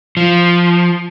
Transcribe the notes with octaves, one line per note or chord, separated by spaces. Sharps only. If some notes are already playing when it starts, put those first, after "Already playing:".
F3